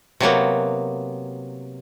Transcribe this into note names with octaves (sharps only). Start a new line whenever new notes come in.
C3 F#3 A#3 B3